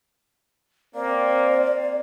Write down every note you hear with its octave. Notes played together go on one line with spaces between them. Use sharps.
A#3 C4 D5